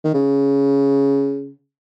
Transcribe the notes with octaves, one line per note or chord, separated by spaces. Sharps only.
D#3
C#3